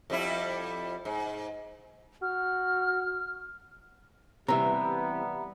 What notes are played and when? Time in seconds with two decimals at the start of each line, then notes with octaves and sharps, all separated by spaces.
0.10 F2 G3 E4
1.05 G#2
2.22 F#4 F6
4.48 C3 E3 G3 B3 E5 A#5